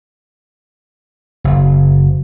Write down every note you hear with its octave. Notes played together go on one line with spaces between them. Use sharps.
F#1